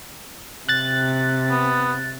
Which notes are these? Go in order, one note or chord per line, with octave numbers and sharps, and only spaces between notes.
C3 F#6 A6
B3